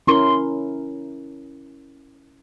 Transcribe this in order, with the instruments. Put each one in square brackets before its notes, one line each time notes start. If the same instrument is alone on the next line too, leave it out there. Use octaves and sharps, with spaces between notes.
[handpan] C#4 E4 A#4 [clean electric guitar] C6